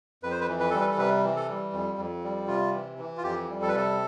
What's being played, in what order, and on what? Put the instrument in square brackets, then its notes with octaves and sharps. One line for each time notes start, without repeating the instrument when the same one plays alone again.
[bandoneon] F2 B4
C5
B4
E3
B4
G3 A4
B4
A4
C3 B4
E3
A4
G3
F2
F2
G3
C3 F4
E3
E3
F4
F2 G4
G3
A4
B4
C3 A4